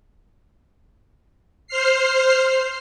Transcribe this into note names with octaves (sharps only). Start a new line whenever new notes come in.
C5 F6 C7